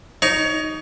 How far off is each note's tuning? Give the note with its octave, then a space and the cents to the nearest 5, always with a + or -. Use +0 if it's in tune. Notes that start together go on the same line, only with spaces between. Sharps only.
D#4 +0 C#5 +30